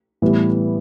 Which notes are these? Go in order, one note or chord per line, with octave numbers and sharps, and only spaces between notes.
A2 E3 G3 B3